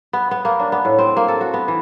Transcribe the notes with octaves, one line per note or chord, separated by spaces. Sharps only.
B3
B3
A#3
D4
B3
A2
C4
A#3
A4
F#4
B3
E3